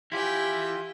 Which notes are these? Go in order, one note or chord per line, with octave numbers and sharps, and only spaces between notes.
E3 E4 F4 G4 G5 G#5